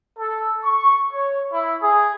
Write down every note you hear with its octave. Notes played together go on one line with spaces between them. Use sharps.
A4
C#6
C#5
E4
G#4